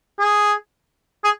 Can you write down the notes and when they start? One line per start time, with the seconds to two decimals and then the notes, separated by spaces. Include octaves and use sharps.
0.19 G#4
1.24 G#4